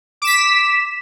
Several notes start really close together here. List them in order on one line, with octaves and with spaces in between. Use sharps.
D6 E7 B6